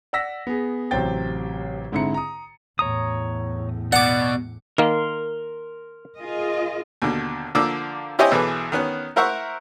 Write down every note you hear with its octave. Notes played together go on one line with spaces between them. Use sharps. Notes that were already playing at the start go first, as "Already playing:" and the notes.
D5 F#5 E6 A#6 B6
B3 G#4
A1 C3 F#3 C5 G5 A6
G#2 D3 C4 E4 A#5 C#7
A#5 D#6
E2 A2 C#5 A#5 D#6
B2 D5 F#5 D6
D#3 A#3 A#4 C6
F4 G#4 D#5
D#2 B2 D3
D3 F3 A#3 D5 D6 E6
E4 G4 C5 C#5 D#5 G#5
B1 E3 G#4 A4 B4 D6
D#3 B3 C#4 F#6
E4 A#4 C5 E5 F#5 C#6